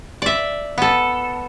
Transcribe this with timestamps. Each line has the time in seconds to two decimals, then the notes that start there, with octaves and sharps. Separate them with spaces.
0.22 D5 E5
0.78 B3 A4